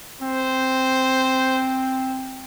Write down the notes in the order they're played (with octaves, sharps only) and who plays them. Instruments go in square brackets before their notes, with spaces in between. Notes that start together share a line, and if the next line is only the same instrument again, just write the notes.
[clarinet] C4 [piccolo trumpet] C5